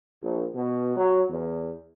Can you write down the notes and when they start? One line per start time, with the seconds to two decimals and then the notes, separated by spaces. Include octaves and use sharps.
0.22 A#1
0.54 B2
0.96 F#3
1.28 E2